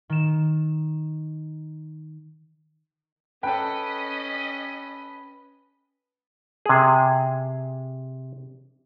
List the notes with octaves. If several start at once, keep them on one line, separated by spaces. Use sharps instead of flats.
D#3 E7
C#4 A4 B4 D#5 G5 B6
C3 G#4